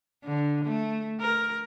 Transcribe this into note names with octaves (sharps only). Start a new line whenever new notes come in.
D3
A3
A#4